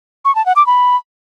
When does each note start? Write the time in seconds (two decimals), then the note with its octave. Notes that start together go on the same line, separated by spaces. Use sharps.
0.25 C#6
0.35 A5
0.46 F#5
0.56 D6
0.67 B5